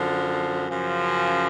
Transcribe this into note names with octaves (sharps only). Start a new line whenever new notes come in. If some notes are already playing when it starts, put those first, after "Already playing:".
Already playing: F#2 D3 F3
F#2 C#3 F3